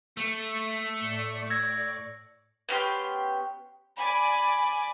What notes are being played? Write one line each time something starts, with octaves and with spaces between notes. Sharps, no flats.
A3
A2 D5 C#6
E6 G#6 A#6
B3 C#4 G4 C6
D5 G#5 B5